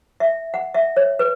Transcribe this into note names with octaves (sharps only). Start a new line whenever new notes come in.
E5
F#5
E5
C#5
B4